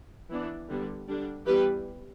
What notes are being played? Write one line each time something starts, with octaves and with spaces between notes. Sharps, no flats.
E3 B3 D4
D3 G3 B3
D3 G3 D4
E3 G3 B3 G4 B4